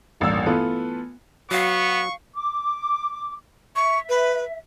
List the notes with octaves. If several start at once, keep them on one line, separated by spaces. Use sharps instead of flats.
D#1 A1 G2 A#3 D5 E6
E3 A3 B3 F4 A4 B4
F#3 B3 F#4 F5 C#6
D6
E5 C#6
B4